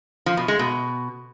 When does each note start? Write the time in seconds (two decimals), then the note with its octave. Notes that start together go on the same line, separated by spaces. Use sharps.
0.26 F3
0.37 B2
0.48 G#3
0.59 B2